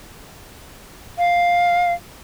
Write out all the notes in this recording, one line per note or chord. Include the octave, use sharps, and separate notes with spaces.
F5